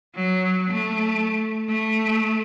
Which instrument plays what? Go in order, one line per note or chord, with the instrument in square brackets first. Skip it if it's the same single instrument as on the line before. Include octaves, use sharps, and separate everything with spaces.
[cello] F#3
A3
A3